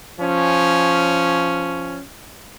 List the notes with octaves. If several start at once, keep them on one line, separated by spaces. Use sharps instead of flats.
F3 C#4